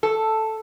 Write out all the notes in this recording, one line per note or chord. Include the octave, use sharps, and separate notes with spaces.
A4